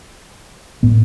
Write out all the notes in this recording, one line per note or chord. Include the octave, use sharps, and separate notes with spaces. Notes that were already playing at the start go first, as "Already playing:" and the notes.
A2 B3